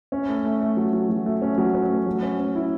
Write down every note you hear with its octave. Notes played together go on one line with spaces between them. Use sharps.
C#4
A3
A3
A3
F#3
F#3
F#3
A3
C#4
F#3
C#4
A3
F#3
C#4
C#4
E4